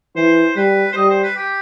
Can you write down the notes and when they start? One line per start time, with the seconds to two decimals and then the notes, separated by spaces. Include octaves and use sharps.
0.15 E3 C5
0.56 G3 B4
0.92 C5
0.96 G3 D#5
1.10 C5
1.23 B4
1.36 G4